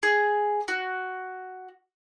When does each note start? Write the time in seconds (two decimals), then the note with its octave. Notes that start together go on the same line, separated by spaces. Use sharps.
0.03 G#4
0.68 F#4